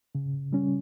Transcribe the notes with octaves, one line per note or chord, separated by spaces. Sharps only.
C#3
G3 C#4